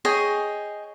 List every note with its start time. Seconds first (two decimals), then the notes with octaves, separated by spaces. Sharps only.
0.05 G#4 C#5 D#5 G5